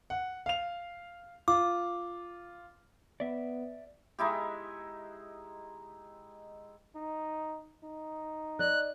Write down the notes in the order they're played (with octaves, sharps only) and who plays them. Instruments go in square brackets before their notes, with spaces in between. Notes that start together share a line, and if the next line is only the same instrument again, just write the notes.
[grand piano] F#5
F5 F7
[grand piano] F4 [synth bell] D6
[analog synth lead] B3 [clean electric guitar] D5 E5
[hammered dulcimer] G#3 D#4 E4 G4
[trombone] D#4
D#4
[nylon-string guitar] D5 D#5 [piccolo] F#6